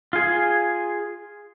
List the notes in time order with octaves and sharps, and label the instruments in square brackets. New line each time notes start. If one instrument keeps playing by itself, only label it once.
[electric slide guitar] F4 G#4